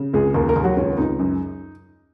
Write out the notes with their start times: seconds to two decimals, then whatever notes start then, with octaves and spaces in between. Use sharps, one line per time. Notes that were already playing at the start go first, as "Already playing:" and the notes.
Already playing: C#3
0.14 C#2 G#3 G#4
0.34 D#2 A#3 A#4
0.48 A#3 A#4
0.56 D#2
0.64 F#3 F#4
0.77 C#2 C#4
0.98 C#2 D#4
1.19 F#2